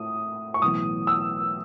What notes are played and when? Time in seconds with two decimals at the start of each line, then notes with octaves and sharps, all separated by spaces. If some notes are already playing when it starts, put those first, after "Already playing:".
Already playing: A2 D#6
0.54 C#6
0.62 B1 A2 E3 B3 D#6
1.07 E6